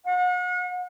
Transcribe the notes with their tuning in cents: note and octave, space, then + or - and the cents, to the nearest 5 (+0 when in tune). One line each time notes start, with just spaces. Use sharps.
F#5 -40